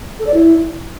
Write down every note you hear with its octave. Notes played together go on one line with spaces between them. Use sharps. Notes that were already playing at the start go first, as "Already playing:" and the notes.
A4
D5
E4